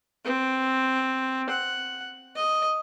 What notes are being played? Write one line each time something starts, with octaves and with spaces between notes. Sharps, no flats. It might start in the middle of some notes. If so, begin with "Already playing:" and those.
C4
F#5
D#5